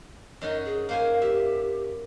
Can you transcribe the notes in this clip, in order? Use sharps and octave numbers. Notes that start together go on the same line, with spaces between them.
F#2 D#4 F#4 D#5
G#4
A#3 C5 F5 G#5
G4 E5